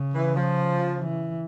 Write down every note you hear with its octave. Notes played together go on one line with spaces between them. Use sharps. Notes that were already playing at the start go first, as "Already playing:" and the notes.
Already playing: C#3
E3
F3
E3